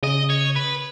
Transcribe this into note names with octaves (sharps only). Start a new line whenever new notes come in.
C#3 D#5
C#5
B4